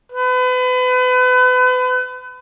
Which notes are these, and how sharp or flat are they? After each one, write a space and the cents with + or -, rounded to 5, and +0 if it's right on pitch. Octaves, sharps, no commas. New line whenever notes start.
B4 +35